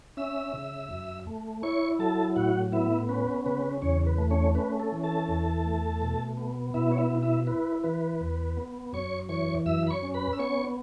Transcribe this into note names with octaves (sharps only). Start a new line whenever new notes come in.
C#4 E5 E6
C#3
F#2
A3
E4 C#5 C#6
F#3 A4 A5
A2 F#4 F#5
B3 E4 E5
C#4 B4
C#3 B4
E2 C#4 C#5
B4
A3
C#4 C#5
C#4 B4
A4
E3
A4 A5
E2
A3
B2
B3
B2 E4 E5
C#5
E4 E5
E4
E4 E5
E4 B4
E3 B4
E2
B3
F#2 C#5 C#6
E3 C#5 C#6
F#2 E5 E6
B5
C#5 C#6
C#4
B4 B5
E6
B3 C#5 C#6